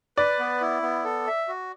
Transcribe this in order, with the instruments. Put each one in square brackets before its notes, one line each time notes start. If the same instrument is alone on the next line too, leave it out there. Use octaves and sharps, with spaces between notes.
[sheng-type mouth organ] B4 [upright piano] D5
[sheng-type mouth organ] B3
E4
B3
A4
E5
F#4